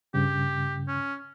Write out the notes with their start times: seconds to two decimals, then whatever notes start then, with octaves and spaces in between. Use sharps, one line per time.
0.14 G2 C#3 G4
0.88 C#4